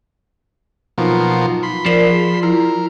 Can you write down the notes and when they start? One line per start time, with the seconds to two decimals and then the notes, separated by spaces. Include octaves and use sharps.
0.98 B2 F3 F#3 A#3 D#4 F4
1.63 B5 C6
1.86 F3 A#4 C5 D5
2.10 G#4
2.43 E4 A#4